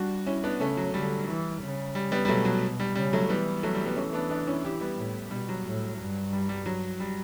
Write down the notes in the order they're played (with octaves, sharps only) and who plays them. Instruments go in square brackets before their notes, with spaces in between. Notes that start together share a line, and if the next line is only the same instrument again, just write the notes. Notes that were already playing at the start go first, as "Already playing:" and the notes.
Already playing: [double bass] G3 [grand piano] D4 F#4
[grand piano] C#4 E4
B3 D4
[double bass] C#3 [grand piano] A3 C#4
[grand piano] F#3
[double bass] D3 [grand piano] G3
[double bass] E3
C#3
[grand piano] G3
G3 B3
G3
[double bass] B2 [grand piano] F#3 A3
[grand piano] F#3
G3
[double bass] C#3 [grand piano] G3
[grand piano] F#3 A3
[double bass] E3 [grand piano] G3 B3
[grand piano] F#3 A3
G3
G3 B3
[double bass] E3 [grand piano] A3 C#4
[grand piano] B3 D4
B3 D4
C#4 E4
E4 G4
G3 B3
[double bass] A2
[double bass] B2 [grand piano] G3
[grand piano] F#3
[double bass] A2
G2
[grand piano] G3
G3
F#3
G3